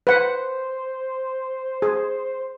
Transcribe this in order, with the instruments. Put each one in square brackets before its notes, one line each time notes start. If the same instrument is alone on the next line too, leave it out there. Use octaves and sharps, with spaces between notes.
[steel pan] B4 F#5 [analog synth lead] C5
[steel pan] G#4